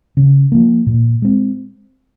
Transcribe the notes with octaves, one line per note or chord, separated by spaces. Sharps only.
C#3
F3 A#3
A#2
G#3 C4